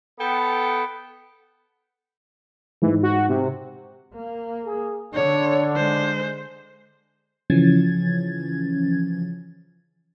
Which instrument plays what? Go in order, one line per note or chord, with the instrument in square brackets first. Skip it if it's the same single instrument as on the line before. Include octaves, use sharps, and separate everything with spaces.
[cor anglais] B3 [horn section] A4 G5
[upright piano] G#2 [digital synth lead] E3
[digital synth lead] F#4
C3
[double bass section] A#3
[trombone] G#4
[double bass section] D3 [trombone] D4 [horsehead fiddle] C#5
[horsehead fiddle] G#3 C5
[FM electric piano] C#3 E3 F3 C#4 G#6 A6